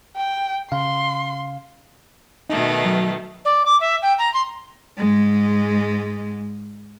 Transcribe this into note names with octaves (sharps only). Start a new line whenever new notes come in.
G5
C#3 F5 C6
B2 D#3 A3 D#4
F#3
D5
D6
E5
G5
A#5
C6
G#2 G#3